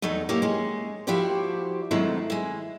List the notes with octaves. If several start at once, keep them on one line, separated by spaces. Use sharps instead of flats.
E2 F#3 A3 D#4
A#3 E4 G4 C#5
G#3 C#4
F3 E4 F#4 G4 C5 D5
D#3 F#3 G#3 A3 C4 E4
G#3 E4